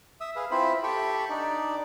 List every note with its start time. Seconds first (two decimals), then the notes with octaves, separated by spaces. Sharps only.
0.21 E5 D#6 E6
0.36 G#4 B4 F5
0.51 C4 E4 F4 C5 B5
0.83 G4 A4 G5 B5 C#6
1.30 D4 D#4 D5